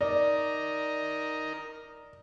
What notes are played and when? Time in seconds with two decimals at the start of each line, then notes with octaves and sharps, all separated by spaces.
0.01 D#4 A#4 D5